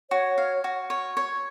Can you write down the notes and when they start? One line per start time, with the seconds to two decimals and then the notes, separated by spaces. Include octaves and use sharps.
0.11 F#4 C#5
0.38 F5
0.64 F#4
0.90 C#5
1.17 C#5